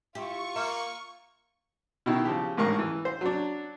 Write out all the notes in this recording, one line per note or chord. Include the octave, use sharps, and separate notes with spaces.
E4 F4 G4 C#6
A#3 E5
B2 D#3 E4
C#3 F3 G4
A1 G#2 A#4 C#6
E3
C5
F#3 D4